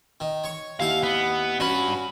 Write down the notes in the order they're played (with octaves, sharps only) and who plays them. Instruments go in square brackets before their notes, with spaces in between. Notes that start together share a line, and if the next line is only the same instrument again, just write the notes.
[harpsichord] D#3
C#5 C#6
[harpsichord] D#2 E4 F#5 [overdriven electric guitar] F5
[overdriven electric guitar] B3
[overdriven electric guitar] G2 B5 [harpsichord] C#4 F#4